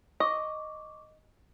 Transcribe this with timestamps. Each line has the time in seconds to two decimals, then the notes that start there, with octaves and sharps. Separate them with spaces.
0.20 D#5 C#6 D6